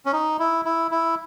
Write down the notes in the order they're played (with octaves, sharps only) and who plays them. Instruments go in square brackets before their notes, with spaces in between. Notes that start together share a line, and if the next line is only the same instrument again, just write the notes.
[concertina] C#4
D#4
E4
E4
E4